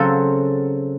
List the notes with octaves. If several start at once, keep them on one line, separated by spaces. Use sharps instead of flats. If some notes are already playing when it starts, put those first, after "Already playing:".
Already playing: C#3 F#3 C4 A4